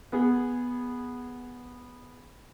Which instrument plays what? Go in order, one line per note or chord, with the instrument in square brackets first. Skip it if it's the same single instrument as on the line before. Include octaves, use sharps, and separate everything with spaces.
[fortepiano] B3 G#4